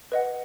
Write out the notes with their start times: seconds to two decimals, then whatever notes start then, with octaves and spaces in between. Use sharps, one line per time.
0.12 B4 D#5 F#5